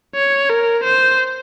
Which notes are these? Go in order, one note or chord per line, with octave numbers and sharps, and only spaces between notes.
C#5
A#4
C5